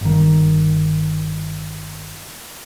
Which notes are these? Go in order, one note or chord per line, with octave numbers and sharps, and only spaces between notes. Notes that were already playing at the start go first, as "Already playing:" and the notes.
G1 D#3